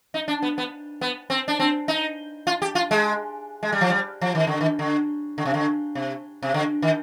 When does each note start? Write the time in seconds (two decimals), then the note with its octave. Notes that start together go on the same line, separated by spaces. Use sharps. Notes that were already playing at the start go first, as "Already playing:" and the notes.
0.14 D#4
0.28 D4
0.42 B3
0.58 B3
1.01 B3
1.30 C4
1.48 D4
1.60 C4
1.88 D#4
2.47 F4
2.62 G4
2.75 F4
2.91 G#3
3.63 G#3
3.72 G3
3.81 F3
3.90 G3
4.21 F3
4.35 D#3
4.47 D3
4.61 D#3
4.79 D3
5.38 D3
5.45 C3
5.54 D3
5.95 C3
6.43 C3
6.54 D3
6.82 D#3